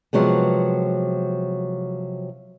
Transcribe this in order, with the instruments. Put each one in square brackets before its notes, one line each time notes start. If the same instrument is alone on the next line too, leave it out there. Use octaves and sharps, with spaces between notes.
[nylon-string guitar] C3 F3 F#3 G#3 B3